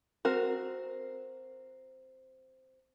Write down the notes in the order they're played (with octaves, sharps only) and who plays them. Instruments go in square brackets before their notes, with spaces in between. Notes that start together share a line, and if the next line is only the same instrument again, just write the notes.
[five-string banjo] C4 F#4 A#4